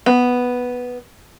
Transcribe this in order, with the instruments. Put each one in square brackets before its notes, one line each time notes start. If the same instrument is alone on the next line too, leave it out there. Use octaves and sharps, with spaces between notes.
[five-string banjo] B3